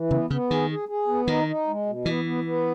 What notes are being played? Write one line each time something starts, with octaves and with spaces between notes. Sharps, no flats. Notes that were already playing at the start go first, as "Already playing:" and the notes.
Already playing: E3
C#3 B3
C#3 B3
D#3 G#4
G#4
G#4
B3
D#3 D#4
D#4
G#3
B2
E3 B3
B3
B3